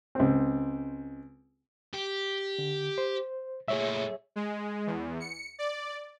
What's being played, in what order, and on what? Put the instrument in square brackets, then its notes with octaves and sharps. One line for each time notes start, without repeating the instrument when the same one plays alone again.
[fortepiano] C#2 C4
[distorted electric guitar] G4
[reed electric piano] D3
C5
[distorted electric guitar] A#2 A3 [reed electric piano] G#4 C#5 E5
[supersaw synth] G#3
E2
C#7
D5